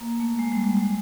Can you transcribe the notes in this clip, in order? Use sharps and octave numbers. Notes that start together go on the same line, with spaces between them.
A#3
A3
G#3
G3
G3
G#3